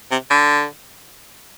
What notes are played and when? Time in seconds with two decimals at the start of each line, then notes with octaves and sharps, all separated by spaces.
0.11 C3
0.31 D3